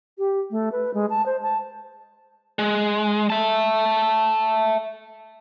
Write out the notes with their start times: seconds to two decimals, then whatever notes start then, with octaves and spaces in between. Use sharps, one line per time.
0.18 G4
0.51 A3
0.72 B4
0.94 G#3
1.10 A5
1.26 C5
1.43 A5
2.59 G#3
3.30 E5 A5